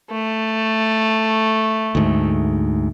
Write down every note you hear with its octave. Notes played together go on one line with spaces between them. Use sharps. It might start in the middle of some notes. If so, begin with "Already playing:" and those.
A3
D2 G#2